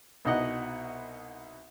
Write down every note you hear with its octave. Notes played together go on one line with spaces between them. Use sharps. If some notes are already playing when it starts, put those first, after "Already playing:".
C2 B2 D#4 D#5 F#5